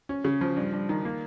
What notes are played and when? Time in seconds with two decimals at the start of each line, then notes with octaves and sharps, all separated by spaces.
0.09 C#4
0.25 C#3
0.41 F3
0.56 G2
0.73 G2
0.89 D#3
1.05 A#3